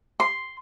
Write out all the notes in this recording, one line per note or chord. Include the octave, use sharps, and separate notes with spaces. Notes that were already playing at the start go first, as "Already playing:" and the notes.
C6